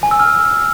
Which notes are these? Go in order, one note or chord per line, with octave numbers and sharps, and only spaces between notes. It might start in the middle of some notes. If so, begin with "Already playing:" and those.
G#5
E6
F6